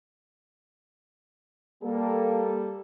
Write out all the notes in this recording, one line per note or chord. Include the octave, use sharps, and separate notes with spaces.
G3 A#3 A4